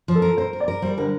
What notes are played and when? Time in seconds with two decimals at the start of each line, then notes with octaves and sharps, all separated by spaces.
0.08 F3
0.15 A4
0.22 A#4
0.37 A#4 C5
0.53 A#4
0.60 D5
0.68 A#4
0.82 G3 C5
0.98 D3 A#4